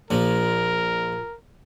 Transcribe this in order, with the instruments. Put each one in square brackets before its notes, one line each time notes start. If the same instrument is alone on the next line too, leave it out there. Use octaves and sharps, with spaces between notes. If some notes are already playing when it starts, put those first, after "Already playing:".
[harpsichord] A#1 F3 [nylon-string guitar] A#2 [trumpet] A#4